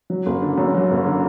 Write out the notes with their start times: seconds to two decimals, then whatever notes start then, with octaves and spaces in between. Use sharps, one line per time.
0.10 F#3
0.26 F#1
0.42 D3
0.58 F#2
0.75 F#3
0.91 F#1
1.07 D3